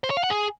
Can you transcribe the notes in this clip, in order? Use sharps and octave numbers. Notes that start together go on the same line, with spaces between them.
C5
C#5
F5
F#5
G#4